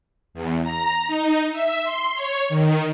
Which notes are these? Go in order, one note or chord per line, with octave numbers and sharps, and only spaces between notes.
E2
A#5
D#4
E5
C6
C#5
D#3